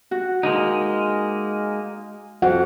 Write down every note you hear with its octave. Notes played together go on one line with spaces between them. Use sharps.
F#4
G#3 A#3 D#4
F2 F#4 F#5